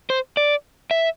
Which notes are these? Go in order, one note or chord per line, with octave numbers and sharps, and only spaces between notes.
C5
D5
E5